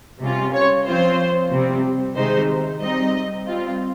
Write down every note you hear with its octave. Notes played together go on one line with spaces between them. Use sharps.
C3 G3 C#4 F4
C#5
F3 C4 F4 C5
C3 G3 C4
C3 D#3 G#3 D#4 C5
G3 C4 D#4 D#5
G3 C4 F4